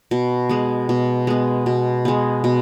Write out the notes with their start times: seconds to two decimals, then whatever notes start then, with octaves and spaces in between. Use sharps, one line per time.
0.11 B2
0.49 G#3 B3
0.89 B2
1.27 G#3 B3
1.66 B2
2.05 G#3 B3
2.44 B2